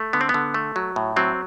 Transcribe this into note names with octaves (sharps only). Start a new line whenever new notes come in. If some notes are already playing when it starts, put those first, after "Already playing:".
Already playing: A3
D3 B3
C4
B3
D3
A3
F#3
A2
F#3 C4